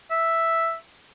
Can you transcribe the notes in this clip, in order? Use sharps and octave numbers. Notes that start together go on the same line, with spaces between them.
E5